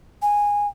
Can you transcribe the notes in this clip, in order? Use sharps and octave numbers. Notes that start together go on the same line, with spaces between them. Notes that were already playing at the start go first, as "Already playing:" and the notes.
G#5